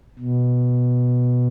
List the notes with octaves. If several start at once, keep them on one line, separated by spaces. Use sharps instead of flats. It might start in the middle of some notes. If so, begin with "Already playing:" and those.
B2